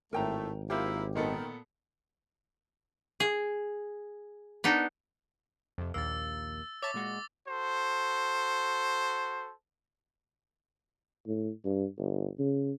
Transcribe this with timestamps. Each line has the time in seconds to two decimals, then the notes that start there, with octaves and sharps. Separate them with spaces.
0.13 G#1 A2 A3 A#4 G5 A#5
0.70 A#3 E4 F4 G4 C5 E5
1.15 A#2 D#3 B3 A4
3.20 G#4
4.64 B3 D4 D#4
5.78 F2 C3
5.94 A#1 D#2 A#3 E6 A6
6.82 C#5 E5 A5 D6 A6
6.94 A#2 G#3 F#4
7.48 F#4 A4 C5
11.27 A2
11.65 G2
11.99 G1
12.39 C#3